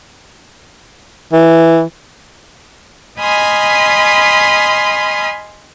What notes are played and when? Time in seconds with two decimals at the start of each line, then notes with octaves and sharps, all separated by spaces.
1.33 E3
3.19 D#5 G#5 B5 C6 D#6 F6